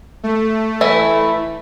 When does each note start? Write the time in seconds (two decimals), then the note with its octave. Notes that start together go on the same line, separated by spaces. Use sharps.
0.23 A3
0.81 E3 E4